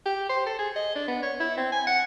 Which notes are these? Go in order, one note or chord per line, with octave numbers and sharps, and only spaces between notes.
G4
C5
A4
G#4
D#5
D4
B3
C#5
E4
C4
G#5
F#5